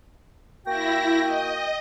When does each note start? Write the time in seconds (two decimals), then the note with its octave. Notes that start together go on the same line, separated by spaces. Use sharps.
0.65 A#3 E4 F#4 G5 A#6
1.24 D#5